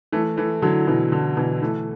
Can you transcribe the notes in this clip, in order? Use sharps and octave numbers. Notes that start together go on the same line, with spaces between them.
E3 A3
E3 A3
D3 F#3
B2 E3
D3
B2 E3
E3 A3